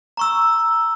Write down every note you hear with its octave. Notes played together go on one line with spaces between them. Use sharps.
A#5 C#6 E6